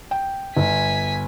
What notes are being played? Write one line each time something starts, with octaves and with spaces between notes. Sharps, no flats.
G5
G1 G#5 B6